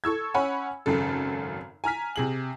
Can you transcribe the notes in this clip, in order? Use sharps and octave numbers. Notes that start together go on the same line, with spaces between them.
A4 C#6 E6 G#6
C#4 C#5 F#5 G#5 B5
G#1 F#2 C#3 A4
G#5 A#5 F6 B6
C3 G#4 F#7